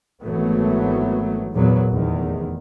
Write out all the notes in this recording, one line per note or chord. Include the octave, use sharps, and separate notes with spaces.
G#1 E3 F#3 A3 B3
E2 A#2 F#3 B3
F1 E2 D#3